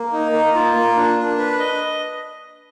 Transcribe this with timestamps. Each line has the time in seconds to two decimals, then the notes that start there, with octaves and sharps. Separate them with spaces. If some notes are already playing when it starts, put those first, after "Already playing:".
Already playing: A#3
0.13 D#4
0.33 A#3
0.54 F4
0.75 A#3
0.96 D4
1.18 D4
1.38 B4
1.59 D#5